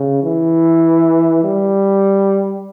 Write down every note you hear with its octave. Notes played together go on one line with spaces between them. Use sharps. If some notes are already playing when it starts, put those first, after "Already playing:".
Already playing: C#3
E3
G3